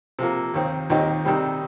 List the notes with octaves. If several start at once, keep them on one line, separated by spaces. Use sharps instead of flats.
C3 F3 A#3
D#2 D#3 C4
D#2 D#3 C4 D#4 G4
C3 D#3 G3 C4